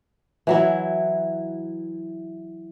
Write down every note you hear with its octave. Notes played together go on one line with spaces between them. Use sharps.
E3 F#3 E4